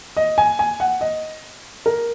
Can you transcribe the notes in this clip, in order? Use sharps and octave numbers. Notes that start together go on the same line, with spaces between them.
D#5
G#5
G#5
F#5
D#5
A#4